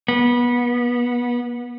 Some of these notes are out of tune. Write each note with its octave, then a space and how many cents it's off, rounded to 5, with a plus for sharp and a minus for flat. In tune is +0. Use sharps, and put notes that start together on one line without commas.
B3 -25